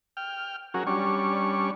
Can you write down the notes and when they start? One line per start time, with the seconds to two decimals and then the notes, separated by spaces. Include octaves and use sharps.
0.17 G5 F6
0.74 F#3 C#4 F#4 G#4 A#4
0.87 G3 C#4 D4 C#6